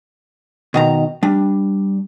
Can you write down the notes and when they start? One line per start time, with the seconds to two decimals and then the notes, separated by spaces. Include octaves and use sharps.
0.74 B2 D#3 A#5
1.23 G3 D4